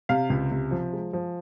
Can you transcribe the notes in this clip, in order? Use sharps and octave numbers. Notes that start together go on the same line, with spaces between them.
C3 F5
C#2
C3
F3
G#3
F3